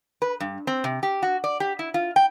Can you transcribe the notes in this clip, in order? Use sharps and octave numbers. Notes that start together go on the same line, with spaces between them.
B4
G2
C4
C3
G4
F#4
D5
G4
E4
F4
G5